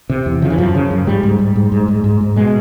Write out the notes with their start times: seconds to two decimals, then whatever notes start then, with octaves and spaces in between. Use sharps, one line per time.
0.10 C3
0.26 E2
0.42 C#3 F3
0.50 E3
0.58 F#2 F3
0.75 C#3
0.91 F#2
1.07 G#2 G3
1.23 G#2
1.39 G#2
1.55 G#2
1.72 G#2
1.88 G#2
2.04 G#2
2.21 G#2
2.36 B2 G#3